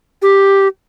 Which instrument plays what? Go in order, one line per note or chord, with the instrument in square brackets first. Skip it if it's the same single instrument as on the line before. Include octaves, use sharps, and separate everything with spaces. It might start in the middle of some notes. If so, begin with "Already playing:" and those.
[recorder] G4